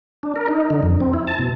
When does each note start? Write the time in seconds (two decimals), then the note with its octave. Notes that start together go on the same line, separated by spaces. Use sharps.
0.23 D4
0.36 A#4
0.48 D#4
0.70 D3
0.83 F2
1.00 C4
1.13 E4
1.27 A5
1.39 B2